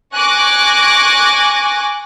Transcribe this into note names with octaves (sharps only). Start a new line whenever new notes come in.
G#5 C#6 D6 F#6 A#6